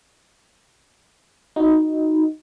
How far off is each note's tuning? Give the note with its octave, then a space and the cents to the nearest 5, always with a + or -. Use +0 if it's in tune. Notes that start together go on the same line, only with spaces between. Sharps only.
D#4 +5 F#4 +0